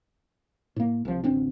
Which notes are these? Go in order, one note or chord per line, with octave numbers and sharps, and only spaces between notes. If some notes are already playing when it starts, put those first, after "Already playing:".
A2 A#3
C2 F3
A1 D2 C4 D4